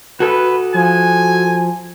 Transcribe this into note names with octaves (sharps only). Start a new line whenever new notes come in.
F#4 A4 B4
F3 G#5